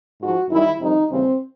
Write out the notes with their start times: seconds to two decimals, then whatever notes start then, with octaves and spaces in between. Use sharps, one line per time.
0.20 G#2 F3 F#4
0.50 F#2 D#3 G3 E4
0.79 F2 C3 D#3 G3 D#4
1.10 D#2 C#3 E3 G3 C4